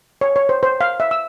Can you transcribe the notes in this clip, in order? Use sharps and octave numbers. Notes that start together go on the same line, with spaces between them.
C#5
C#5
C5
C5
F5
E5
E6